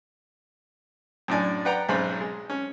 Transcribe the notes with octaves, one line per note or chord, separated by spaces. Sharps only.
F#2 A2 D4 D5 G#5
B4 D5 F#5 G5 A#5
B1 G#2 C#4 C5 B5
G#3
C#4